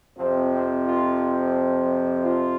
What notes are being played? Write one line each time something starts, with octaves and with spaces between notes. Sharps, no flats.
F2 C3 F3 C4
C4
F4
F4